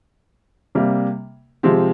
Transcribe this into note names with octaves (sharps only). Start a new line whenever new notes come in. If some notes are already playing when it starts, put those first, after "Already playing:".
C3 G3 A#3
C3 F3 G#3 C4 G4